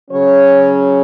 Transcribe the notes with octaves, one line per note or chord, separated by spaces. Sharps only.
C#3 F#3 C#4 C#5